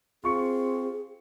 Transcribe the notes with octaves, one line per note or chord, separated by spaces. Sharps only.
C4 F4 G#4 C#6 C#7